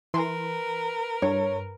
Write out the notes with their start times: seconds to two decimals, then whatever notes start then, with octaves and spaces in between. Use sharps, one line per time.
0.14 E3 A#4 B4 C6
1.22 G2 C#5